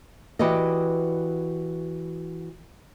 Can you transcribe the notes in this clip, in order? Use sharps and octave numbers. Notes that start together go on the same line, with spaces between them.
E3 F#4 G4 B4 D5 D#5